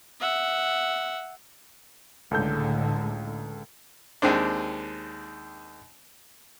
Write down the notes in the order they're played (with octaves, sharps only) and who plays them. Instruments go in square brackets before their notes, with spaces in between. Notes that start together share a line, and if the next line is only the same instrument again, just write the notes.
[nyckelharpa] E5 F#5
[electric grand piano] C#2 A4 G6 [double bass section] A2 D3 G#3
[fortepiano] D#2 D#3 G#3 C4 D4